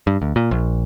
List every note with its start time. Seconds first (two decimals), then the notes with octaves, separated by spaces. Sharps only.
0.07 G2
0.22 D2
0.36 A#2
0.51 A#1